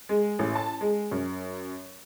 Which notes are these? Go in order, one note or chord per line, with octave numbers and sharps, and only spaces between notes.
G#3
A1
A5
G#3
F#2